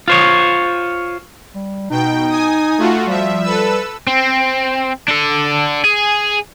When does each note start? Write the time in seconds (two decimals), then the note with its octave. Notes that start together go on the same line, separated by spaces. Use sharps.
0.08 F4 C5 C#5
1.55 G3
1.90 B2 D#4 G5
2.29 G#5 D#6
2.78 A3 F4 F#4
3.07 F3 G3 E5
3.43 A4 B4 E6
4.07 C4
5.08 D4 A4
5.85 G#4